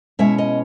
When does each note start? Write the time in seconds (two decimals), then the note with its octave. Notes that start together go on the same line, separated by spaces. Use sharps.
0.19 B2 G#3 C#4 E4 E5
0.38 D#5